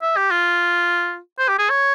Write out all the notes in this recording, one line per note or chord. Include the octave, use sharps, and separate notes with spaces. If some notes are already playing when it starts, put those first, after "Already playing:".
E5
G4
F4
C5
G4
G#4
C#5